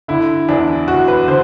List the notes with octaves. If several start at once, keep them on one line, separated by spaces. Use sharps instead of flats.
D3 E4
E2 D4
E2 F#4
B4
D3 C5